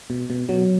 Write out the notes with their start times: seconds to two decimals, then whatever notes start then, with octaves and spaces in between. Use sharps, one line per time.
0.10 B2
0.30 B2
0.49 B2 F#3